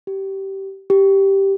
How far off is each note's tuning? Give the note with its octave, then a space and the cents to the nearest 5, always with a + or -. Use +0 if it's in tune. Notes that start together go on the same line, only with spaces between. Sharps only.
G4 -15
G4 -5